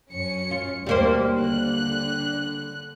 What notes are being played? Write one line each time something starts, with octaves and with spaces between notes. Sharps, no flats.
F#2 C#4 C#7
F4
D#2 B2 G3 A#3 C5
D3 F#6